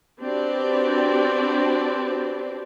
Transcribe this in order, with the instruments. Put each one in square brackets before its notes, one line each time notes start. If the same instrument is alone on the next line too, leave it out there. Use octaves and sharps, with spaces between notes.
[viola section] C4 D4 F#4 G4 B4 D5